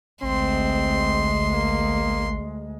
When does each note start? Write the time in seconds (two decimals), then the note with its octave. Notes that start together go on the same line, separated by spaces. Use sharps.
0.23 A1 D2 G#3 C4 C6
1.53 A#3